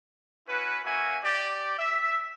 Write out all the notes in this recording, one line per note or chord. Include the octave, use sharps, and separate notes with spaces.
C#4 E4 F#4 B4
A#3 C#4 F#4 E5 G#5
G4 D5
E5